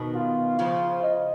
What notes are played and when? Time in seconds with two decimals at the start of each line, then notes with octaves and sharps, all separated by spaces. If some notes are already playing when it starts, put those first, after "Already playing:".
Already playing: B2 D#3
0.15 F4
0.59 C#3 F3 F4
1.03 D#5